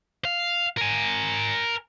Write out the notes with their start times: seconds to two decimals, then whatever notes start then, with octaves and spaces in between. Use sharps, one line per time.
0.25 F5
0.77 A#4 G#5